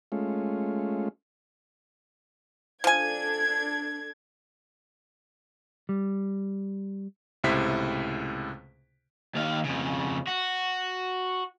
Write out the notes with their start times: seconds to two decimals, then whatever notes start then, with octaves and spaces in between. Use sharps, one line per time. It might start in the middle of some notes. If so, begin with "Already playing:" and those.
0.12 G#3 A3 C#4 F4
2.84 F3 D4 A4 G#5 G#6
5.89 G3
7.44 C#2 A2 C3 E4 C5 B6
9.35 D#2 F5
9.64 F2 C#3
10.27 F#4